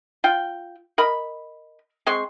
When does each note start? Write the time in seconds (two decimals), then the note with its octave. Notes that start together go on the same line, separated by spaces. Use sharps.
0.24 F4 G5
0.98 A#4 D#5 B5
2.06 G#3 C4 C6 C#6